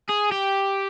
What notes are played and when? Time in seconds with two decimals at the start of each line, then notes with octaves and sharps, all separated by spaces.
0.09 G#4
0.31 G4